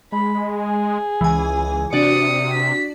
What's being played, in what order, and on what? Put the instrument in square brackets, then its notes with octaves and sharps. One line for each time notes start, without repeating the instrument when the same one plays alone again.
[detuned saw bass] G#3 [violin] B5
[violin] G#4
[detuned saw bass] C#2 [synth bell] E3 G#5
[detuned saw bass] C3 [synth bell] D4 F#4 D5 [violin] D#6 C#7
[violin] B6